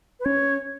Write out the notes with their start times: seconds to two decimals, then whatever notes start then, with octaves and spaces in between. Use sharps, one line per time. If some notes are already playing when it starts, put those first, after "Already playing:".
0.20 B4
0.25 C#4 C#5